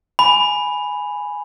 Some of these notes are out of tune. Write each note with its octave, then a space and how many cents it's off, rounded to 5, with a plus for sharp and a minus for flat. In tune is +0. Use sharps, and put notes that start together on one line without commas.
G#5 +0 B5 +0